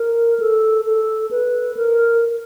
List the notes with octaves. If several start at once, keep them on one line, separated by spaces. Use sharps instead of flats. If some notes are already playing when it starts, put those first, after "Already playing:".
Already playing: A#4
A4
A4
B4
A#4